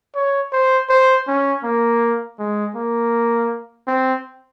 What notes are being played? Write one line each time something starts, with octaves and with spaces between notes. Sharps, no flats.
C#5
C5
C5
C#4
A#3
G#3
A#3
C4